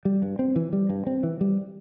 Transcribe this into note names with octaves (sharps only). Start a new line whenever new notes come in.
G3
G2
C4
E3
G3
G2
C4
E3
G3